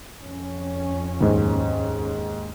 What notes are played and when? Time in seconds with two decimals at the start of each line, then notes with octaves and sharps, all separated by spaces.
0.22 F2 C#4
1.20 D#2 G#2